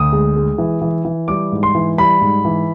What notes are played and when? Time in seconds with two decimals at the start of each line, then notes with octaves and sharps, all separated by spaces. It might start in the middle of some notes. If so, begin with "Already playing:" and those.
Already playing: D2 D#6
0.12 G#3
0.36 G#3
0.58 E3
0.81 E3
1.05 E3
1.28 G3 D6
1.52 G#2
1.63 C6
1.75 E3
1.98 G3 B5
2.21 G#2
2.45 E3